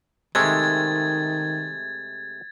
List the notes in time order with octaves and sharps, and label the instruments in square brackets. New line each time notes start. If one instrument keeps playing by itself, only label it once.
[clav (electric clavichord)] C3 G#3 A3 [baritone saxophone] D#3 [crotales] G#6 A6